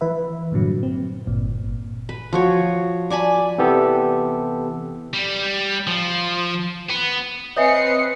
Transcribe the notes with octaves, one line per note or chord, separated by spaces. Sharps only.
E3 B4 E5
G2 A#2 D3 F#3
C4
G1 A#2
B4
F3 F#4 C#5
D5 G#5 A5 B5
C3 E3 B3 G4 A4
G3
F3
B3
C4 B4 C#5 D#5 E5 G#5 C7 C#7